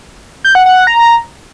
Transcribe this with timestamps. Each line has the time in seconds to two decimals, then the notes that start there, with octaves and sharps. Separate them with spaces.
0.44 G6
0.55 F#5
0.66 F#5
0.76 F#5
0.87 A#5